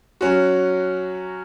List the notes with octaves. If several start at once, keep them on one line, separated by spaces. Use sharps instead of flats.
F#3 C#4 F#4